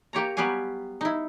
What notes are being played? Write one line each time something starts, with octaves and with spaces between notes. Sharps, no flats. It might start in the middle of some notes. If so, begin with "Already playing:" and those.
A#3 G4 C#5 A#5
F#3 G3 B3 G4 F5 G#5
D#4 E4